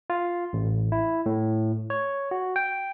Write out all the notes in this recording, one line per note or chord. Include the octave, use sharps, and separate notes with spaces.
F4
A1
E4
A2
C#5
F#4
G5